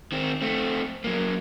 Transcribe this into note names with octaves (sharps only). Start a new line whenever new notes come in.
D#3 C4
A3 C4
F#3 A#3